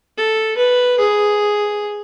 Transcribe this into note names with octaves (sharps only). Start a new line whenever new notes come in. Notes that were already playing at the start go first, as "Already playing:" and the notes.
A4
B4
G#4